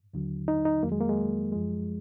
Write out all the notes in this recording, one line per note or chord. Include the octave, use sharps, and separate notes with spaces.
D#2 D3 F#3
D#4
D#4
F2 D#3 F#3 A#3
G#3
A#3
G#3
F#2 F3 G#3